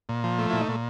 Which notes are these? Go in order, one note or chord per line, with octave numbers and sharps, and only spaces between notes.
A#2
F3
A3
A#2 E4
D#4
A#2